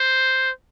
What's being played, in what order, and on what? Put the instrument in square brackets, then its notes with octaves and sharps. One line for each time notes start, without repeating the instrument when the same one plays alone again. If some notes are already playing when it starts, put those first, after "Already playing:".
Already playing: [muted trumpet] C5